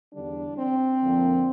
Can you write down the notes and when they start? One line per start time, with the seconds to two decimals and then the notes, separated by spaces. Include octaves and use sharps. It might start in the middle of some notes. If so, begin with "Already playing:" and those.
0.12 E2 D3 G3 D4
0.57 C4
1.01 F2 D3 F3 A#3